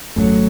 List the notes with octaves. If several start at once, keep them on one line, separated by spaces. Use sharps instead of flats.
G#1 F#2 D3 F#3 A3